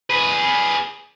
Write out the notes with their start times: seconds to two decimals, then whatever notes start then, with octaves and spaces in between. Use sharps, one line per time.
0.10 G#4 B4